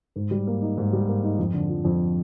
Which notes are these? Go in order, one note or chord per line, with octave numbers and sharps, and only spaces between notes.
G#2
G3
A#3
D#4
G#2
G3
A#3
D#4
F2
D3
F3
F2